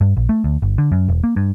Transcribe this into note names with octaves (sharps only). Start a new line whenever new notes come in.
G2
A#1
A3
D2
G1
D3
F#2
E1
A#3
G2